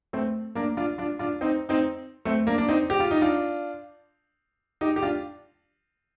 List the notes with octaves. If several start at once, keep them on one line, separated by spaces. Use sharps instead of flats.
A3 C4
A#3 D4
D4 F4
D4 F4
D4 F4
C4 D#4
C4 D#4
A3 C4
A#3 D4
D4
C4 D#4
G4
F4
D#4
D4 F4
D#4 G4
G4
D4 F4